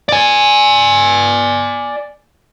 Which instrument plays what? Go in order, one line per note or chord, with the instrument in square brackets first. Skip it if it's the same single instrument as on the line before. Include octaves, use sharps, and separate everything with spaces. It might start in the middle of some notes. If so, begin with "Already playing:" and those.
[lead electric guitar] D5 G#5